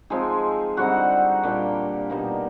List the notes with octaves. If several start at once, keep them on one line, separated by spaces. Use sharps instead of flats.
F3 G#3 C4 D#4 G#4 G#5
D3 G3 C4 D#4 F#4 F#5
A#2 G3 A#3 D4 G4 G5
B2 G3 A#3 D#4